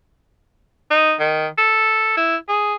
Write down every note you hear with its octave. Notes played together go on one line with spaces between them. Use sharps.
D#4
D#3
A4
E4
G#4